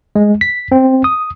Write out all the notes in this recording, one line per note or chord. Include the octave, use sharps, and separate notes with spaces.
G#3
B6
C4
D#6